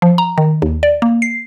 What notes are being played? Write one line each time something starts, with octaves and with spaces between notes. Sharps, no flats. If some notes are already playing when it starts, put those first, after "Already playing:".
F3
A#5
D#3
D#2
D5
A#3
C7